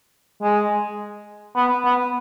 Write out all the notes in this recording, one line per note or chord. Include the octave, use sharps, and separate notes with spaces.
G#3
B3
B3